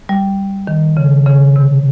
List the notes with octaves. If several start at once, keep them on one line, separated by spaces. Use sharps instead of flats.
G3
D#3
C#3
C#3
C3